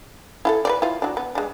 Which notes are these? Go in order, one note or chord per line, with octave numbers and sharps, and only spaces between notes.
E4 F4 A4
B4 C5 D5
E4 F4
F#3 D4
B3
G#3 D4